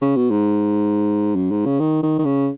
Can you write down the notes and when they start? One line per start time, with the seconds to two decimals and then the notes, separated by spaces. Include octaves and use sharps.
0.01 C#3
0.16 B2
0.31 G#2
1.35 F#2
1.51 G#2
1.65 C#3
1.80 D#3
2.03 D#3
2.19 D#3
2.25 C#3